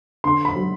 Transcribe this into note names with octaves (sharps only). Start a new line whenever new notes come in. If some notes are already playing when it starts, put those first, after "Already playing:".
D3 C6
B5
F#3